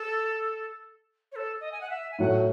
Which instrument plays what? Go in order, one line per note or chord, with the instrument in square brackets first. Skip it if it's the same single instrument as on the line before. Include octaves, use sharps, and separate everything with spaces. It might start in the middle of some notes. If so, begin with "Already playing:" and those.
Already playing: [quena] A4
C#5
A4
D#5
G#5
F#5
E5
G#5
[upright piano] A2 F#3 A3 [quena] F#5